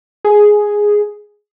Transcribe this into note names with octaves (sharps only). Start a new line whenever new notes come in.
G#4